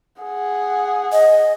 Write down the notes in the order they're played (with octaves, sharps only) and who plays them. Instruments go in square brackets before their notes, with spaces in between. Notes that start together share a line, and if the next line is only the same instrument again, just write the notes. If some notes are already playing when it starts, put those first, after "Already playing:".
[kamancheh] G#4 F#5
[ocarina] D#5